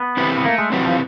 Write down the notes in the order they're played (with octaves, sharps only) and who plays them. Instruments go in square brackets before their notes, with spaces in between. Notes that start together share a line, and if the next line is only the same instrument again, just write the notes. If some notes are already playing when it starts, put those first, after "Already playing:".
Already playing: [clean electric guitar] B3
[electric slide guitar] C4 E4 G4 B4
[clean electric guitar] B3
[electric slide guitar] A3 [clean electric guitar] A#3
[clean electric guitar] G#3
[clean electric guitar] F#3 [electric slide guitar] C4 E4 G4 B4
[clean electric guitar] F3